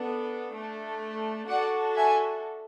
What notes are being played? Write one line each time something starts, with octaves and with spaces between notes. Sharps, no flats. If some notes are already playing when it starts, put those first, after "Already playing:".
Already playing: B3 D4 A4
A3 D4 A4
D4 F#4 A4 D5 F#5
E5 G#5